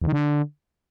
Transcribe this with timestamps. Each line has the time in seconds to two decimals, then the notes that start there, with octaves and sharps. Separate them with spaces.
0.02 E2
0.07 D#3
0.13 D3